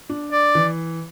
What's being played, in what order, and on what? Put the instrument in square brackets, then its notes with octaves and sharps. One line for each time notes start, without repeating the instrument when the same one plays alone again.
[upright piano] D4
[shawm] D5
[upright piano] E3